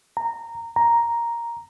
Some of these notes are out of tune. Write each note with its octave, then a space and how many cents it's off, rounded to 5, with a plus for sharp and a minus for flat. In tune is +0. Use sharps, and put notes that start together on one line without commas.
A#5 -15
A#5 +5